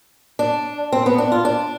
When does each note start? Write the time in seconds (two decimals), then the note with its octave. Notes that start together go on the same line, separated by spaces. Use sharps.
0.39 D4
0.92 C4
1.06 B3
1.18 D4
1.32 F4
1.45 D4